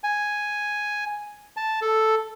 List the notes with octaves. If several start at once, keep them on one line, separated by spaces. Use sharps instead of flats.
G#5
A5
A4